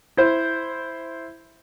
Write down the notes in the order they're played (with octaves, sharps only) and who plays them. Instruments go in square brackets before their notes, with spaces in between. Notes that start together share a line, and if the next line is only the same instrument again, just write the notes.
[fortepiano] E4 C5